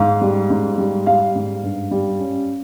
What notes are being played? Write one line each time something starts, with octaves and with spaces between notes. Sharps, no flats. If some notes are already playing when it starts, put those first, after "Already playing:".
Already playing: G#2 F5
G3
G#2
G3
G3 F5
G#2
G2
G3
C#4